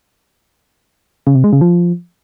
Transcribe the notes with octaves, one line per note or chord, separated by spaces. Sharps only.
C#3
C3
G#3
C#3
F3